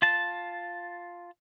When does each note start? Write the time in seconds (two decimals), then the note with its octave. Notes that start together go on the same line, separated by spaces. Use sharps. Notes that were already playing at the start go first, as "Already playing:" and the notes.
0.02 F4 A5